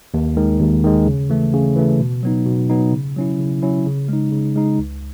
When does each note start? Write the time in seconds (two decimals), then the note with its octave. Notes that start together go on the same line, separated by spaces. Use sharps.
0.14 D#2
0.37 D#3 G#3
0.60 D#2
0.84 D#3 G#3
1.07 C#3
1.30 E3 A3
1.53 C#3
1.76 E3 A3
2.00 B2
2.23 F#3 B3 D#4
2.46 B2
2.69 F#3 B3 D#4
2.93 C#3
3.16 F#3 C#4 E4
3.39 C#3
3.62 F#3 C#4 E4
3.86 C#3
4.09 G#3 D#4
4.32 C#3
4.56 G#3 D#4
4.79 C#2